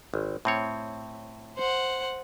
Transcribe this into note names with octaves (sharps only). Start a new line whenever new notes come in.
G#1
A2 C4 C#5
C5 F#5